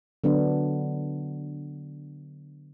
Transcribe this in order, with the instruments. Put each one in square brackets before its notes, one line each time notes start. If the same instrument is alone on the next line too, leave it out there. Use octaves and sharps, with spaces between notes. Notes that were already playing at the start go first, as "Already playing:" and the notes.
[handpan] D3 F#3 B3 D4